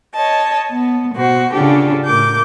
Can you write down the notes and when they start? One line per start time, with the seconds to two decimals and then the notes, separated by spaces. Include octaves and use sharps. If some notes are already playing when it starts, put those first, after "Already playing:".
0.13 C#5 D#5 A5
0.70 B3
1.15 B2 F#4 C5
1.52 C#3 D4 F4 G4 A4
2.06 A2 A#4 D6 G6